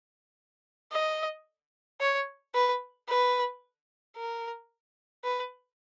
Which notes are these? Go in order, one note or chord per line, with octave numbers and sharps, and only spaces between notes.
D#5
C#5
B4
B4
A#4
B4